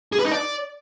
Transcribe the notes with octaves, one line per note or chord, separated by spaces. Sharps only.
G#4
B4
D#4
D5